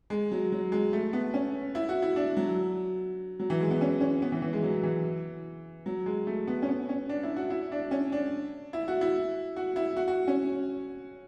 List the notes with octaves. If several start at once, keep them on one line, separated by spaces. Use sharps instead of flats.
G#3
F#3
F#3
G#3
A3
B3
C#4
E4
F#4
E4
D4
F#3
F#3
E3
G#3
B3
C#4
C#4
B3
E3
E3
G#3
F#3
E3
F#3
G#3
A3
B3
C#4
B3
C#4
D4
E4
F#4
E4
D4
C#4
D4
E4
F#4
E4
F#4
E4
F#4
F#4
C#4